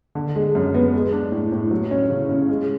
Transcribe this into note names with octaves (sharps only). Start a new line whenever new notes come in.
D3
G#3
F#2
B3
G#3
D4
A2
A2
F#3
C#4
C#3
C#3
G#3